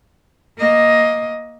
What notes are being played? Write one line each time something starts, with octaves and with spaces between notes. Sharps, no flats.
A#3 D#5